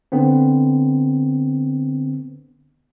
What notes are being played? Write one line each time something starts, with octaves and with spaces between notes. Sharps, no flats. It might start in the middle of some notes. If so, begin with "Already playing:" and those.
D3 B3 C4